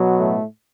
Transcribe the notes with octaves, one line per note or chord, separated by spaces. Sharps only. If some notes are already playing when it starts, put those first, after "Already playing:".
Already playing: B2 F#3
A2 A3